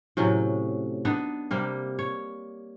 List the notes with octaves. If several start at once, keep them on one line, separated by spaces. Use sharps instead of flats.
A2 C3 F#3 C#4
B3 D4 D#4
C3 G3 A#3
C#5